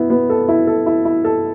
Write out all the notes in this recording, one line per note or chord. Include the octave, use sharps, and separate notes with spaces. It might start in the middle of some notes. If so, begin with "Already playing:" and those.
Already playing: B3 E4
B3
A4
E4
A4
E4
E4
A4